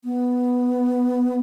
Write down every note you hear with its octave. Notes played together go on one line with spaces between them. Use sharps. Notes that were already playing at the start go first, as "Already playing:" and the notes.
B3